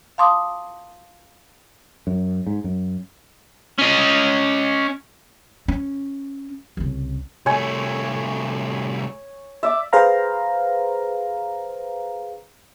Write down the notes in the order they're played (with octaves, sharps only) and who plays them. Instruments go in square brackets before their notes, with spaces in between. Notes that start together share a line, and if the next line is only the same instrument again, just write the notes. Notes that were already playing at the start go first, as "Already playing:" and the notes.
[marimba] F5 A5 C6 D6 D#6
[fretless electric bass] F#2
G#2
F#2
[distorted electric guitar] C#4 D#5
[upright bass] C#4
C2 C#3
[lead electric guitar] C2 A3 [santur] C#5 G#5
[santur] D5 E5
[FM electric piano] G#4 B4 C5 F5 A#5